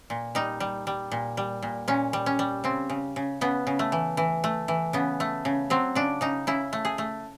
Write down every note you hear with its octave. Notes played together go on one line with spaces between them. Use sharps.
A#2
G3 D#4
G3
G3
A#2
G3
A#2
A#2 C#4
G3
C#4
G3
C#3 C4
C#3
C#3
C#3 B3
C#3
A3
E3
E3
A3
E3
C#3 B3
A3
C#3
F#3 C4
C#3 D4
C#3 D#4
C#3 E4
A3
G#4
A3